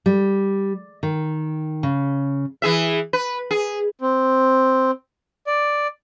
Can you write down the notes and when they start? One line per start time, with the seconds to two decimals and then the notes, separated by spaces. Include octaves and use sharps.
0.06 G3
1.03 D#3
1.83 C#3
2.62 E3 G#4 E5
3.13 B4
3.51 G#4
4.01 C4
5.47 D5